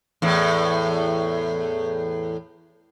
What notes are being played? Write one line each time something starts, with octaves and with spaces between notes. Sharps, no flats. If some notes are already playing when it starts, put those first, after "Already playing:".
E2 A2